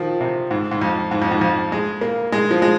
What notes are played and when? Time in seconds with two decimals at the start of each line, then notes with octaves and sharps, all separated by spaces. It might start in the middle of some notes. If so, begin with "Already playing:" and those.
Already playing: D#3 F3 A#3
0.21 C3
0.51 G#2
0.71 G#2
0.82 F2
1.11 G#2
1.22 F2
1.31 G#2
1.41 F2
1.72 G#3
2.01 A#3
2.32 G#3
2.51 F3
2.62 G#3